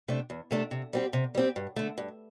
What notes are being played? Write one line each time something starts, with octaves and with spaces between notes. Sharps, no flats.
C3 A3 D4
E2
C3 A3 D4
C3
G3 C4 G4
C3
G3 C4 G4
G2
D3 A3
G2